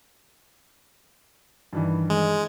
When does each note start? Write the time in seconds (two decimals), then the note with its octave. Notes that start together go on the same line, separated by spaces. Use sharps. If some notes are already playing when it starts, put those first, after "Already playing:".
1.73 G2 D#3 E3
2.10 G#3